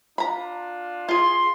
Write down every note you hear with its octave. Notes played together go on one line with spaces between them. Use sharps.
D4 F4 A#5 B5
F4 G#4 C6